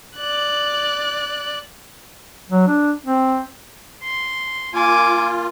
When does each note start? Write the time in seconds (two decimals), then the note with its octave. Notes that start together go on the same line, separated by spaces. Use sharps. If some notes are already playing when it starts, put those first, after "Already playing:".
0.17 D5 F#6
2.50 F#3
2.67 D4
3.05 C4
4.03 C6
4.73 A#3 F4 G#5 D6